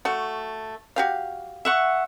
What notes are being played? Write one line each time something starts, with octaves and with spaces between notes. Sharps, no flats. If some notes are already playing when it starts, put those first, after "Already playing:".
A3 F#4
F#4 G4 F5
E5 F#5 C#6